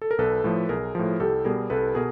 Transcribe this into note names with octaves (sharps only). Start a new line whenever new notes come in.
A4
A#4
B1 A4 B4
A2 F3
B1 G#4 A#4
A2 F3
C2 G4 A4
B2 G3 G#4 A#4
C2 A4 B4
B2 G#4 A#4